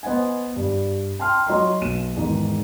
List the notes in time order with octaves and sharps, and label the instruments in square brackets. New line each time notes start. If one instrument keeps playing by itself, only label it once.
[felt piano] B3 C5 D#5 F#5 G#5
G2
G5 A5 C6 F6
F#3 D#5 A#5 C6
B1 D#7 E7
E2 G#2 D#3